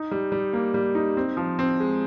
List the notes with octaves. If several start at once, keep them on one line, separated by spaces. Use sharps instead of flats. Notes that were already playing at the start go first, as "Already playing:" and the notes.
Already playing: D#4
G3
G3
A#3
G3
D#4
C4
F3
C4
G#3